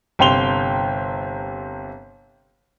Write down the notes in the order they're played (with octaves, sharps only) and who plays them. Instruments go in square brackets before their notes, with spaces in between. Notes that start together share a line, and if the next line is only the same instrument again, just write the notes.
[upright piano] G1 C3 G5 C6 F7 G7